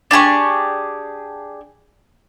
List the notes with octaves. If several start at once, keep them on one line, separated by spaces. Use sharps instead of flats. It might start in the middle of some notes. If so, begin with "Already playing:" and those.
D4 G4 G#4 C#6